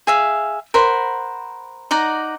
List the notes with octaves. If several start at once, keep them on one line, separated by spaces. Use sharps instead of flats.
G#4 E5 F5
A#4 C5 F#5 B5
D#4 D5 F#5 A#5